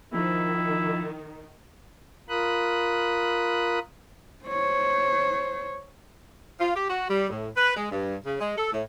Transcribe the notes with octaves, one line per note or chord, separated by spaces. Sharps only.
D#3 F3 E4
F4 A#4 B5 D#6 F#6
C5 C#5
F4
G4
F#4
G3
A2
B4
G#3
G2
C#3
G#3
A4
A2